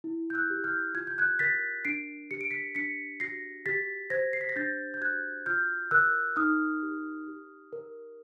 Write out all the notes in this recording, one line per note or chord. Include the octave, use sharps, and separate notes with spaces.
E4
G6
E6 F#6
G4
F6 G6
F4 G#6
G6
F#6 G#6
A#4 A6 B6
D4 C7 D7
G4 C#7
D7
B6 C#7
D4 B6 C#7
F#4 A#6 C7
G4 A6 B6
C5 G#6 A#6
C7
B6
A#6
D4 G6 A6
G6
F#4 F#6 G#6
F4 F6 G6
A#4 E6 F#6
D#4 D#6 F6
G4
G4
A#4